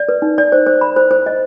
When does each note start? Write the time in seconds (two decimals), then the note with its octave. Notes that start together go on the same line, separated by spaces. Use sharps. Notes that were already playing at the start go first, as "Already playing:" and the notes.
Already playing: D5
0.09 B4
0.22 D#4
0.38 D5
0.52 C5
0.67 C5
0.81 B5
0.96 C5
1.11 C5
1.26 D#5